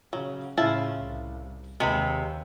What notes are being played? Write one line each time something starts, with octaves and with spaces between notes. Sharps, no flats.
C#3 F#3
A2 C#3 E4 F4 A5
C2
D#2 C3 G#3 B4 B5